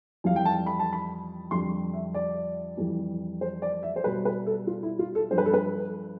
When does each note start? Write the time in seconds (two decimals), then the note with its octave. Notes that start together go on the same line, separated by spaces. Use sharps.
0.24 F2 E3 G3 F5
0.36 G5
0.45 A5
0.66 B5
0.79 A5
0.93 B5
1.51 F2 D3 G3 C6
1.93 E5
2.14 D5
2.77 F2 E3 G3
3.41 C5
3.62 D5
3.83 E5
3.96 C5
4.04 B2 G3 B4
4.25 B4
4.46 A4
4.67 F4
4.83 E4
4.99 F4
5.15 A4
5.31 G2 F3 C5
5.38 B4
5.46 A4
5.54 B4